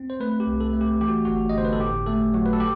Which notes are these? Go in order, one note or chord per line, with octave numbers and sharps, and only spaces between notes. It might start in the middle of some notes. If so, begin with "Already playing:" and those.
Already playing: C4
C5
A3 B4
G4
C2
A4
A3
G4
E3 G4
F#4
G1 F#4
D#5
G1 C5
B4
A4
A2 G4
A3 A4
F#3 F#4
B4
A4
G4